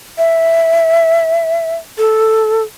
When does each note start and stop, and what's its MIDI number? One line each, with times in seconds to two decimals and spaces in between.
0.18 1.76 76
1.98 2.63 69